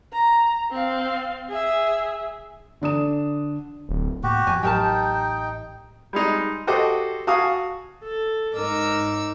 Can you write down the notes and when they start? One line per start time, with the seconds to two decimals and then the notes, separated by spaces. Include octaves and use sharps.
0.12 A#5
0.71 C4 F5
1.49 G#4 E5
2.81 D3 D4 D#6 E7
3.89 D1
4.23 A2 A#3 B3 F#4 G4
4.47 F2 F3 G#5
4.63 A1 F#3 D#4 G4 A#4 G5 A5
6.13 G3 G#3 D#4
6.67 F#4 G4 A4 C5 D#5 D6
7.27 F#4 F5 G#5 A5 C#6 D#6
8.03 A4
8.55 G#2 D#4 A#4 D6 E6